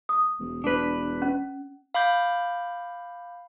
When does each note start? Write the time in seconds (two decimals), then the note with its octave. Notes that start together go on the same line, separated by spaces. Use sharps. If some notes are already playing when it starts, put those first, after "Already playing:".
0.09 D#6
0.40 E1
0.64 E1 D4 B4
1.22 C#4
1.94 F5 B5 D6 G6